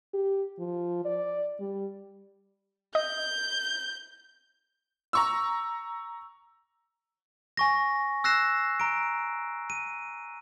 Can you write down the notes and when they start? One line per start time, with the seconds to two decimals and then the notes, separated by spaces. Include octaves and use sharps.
0.14 G4
0.59 F3
1.05 D5
1.60 G3
2.95 D#5 G6
5.13 A#5 C#6 E6
7.57 G#5 C#6 A#6
8.24 E6 F#6 A#6 C7 E7
8.80 A#5 D7
9.70 D#7